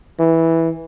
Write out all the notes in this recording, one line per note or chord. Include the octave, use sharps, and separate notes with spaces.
E3